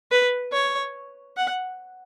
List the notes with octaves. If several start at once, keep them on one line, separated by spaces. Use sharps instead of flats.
B4
C#5
F#5